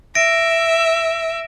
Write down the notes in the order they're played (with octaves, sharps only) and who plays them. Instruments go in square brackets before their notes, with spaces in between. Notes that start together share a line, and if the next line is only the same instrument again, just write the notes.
[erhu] E5 [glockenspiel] A#6 D7